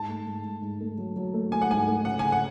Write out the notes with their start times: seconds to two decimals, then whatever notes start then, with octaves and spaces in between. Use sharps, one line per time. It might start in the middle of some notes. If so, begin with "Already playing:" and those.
Already playing: G#2 A5
0.09 A3
0.27 G#2
0.45 G#2
0.62 G#2
0.80 A3
0.98 F#3
1.16 F#3
1.34 A3
1.52 A3 G#5
1.62 F#5
1.70 G#2 G#5
1.88 A3
2.05 C#3 F#5
2.19 C#3 G#5
2.32 F#5